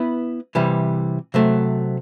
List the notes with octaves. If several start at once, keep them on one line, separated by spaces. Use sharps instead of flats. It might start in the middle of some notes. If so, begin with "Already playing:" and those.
Already playing: B3 E4 B4
C3 E3 G3
C3 F#3 A3